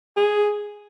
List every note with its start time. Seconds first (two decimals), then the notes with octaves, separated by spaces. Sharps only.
0.17 G#4